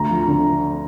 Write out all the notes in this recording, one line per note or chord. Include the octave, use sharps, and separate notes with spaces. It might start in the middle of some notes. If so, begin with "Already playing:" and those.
Already playing: D2 A#5
F3
D3